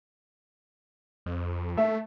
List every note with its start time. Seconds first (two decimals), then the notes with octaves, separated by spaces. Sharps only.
1.26 F2
1.77 A3 E5